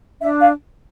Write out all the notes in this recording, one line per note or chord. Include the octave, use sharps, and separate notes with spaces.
D4 E5
F5